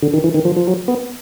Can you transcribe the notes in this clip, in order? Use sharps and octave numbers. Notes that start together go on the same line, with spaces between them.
D3
D#3
E3
D#3
F3
F3
F#3
B3